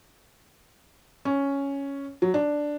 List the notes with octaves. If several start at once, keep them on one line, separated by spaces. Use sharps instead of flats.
C#4
F#3
D4